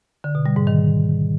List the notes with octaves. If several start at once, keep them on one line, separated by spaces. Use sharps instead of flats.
D3
B2
G3
G#2
D#3